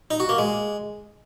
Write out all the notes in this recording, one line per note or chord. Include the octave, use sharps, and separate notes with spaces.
D#4
F#4
A#3
G#3